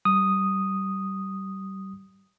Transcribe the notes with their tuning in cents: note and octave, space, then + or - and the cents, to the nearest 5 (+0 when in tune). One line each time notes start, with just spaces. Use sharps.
G3 -30 D#6 +0